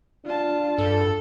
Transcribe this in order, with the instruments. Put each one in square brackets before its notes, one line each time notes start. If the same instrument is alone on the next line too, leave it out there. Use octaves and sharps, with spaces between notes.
[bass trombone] D4 [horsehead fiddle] F4 A5
[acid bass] G2 [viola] A4